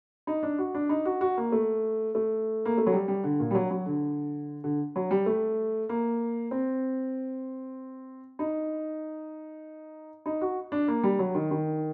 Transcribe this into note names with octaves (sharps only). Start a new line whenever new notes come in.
D#4
D4
F#4
D4
D#4
F#4
F#4
A#3
A3
A3
A#3
A3
F#3
G3
G3
D3
A#2
G3
F#3
F#3
D3
D3
F#3
G3
A3
A#3
C4
D#4
D#4
F#4
D4
A#3
G3
F#3
D#3
D#3